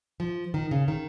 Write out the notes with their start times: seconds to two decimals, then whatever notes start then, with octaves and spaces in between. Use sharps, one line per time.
0.20 F3
0.54 D#3
0.71 C#3
0.88 D#3